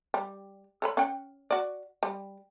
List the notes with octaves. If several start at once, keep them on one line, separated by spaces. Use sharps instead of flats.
G3
A4 C#5 B5
C#4 F#5 G5
F#4 D5
G3